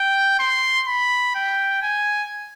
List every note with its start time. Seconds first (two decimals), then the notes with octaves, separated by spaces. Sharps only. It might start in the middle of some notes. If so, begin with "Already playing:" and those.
Already playing: G5
0.39 C6
0.88 B5
1.35 G5
1.82 G#5